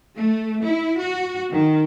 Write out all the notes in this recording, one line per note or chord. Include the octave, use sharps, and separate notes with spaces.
A3
E4
F#4
D#3